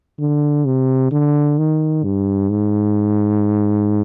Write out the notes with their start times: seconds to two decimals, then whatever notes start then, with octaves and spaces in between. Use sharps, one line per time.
0.19 D3
0.65 C3
1.11 D3
1.58 D#3
2.04 G2
2.50 G#2